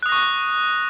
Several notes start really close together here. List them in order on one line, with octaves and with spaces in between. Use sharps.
F#6 D#6 A#6 C#6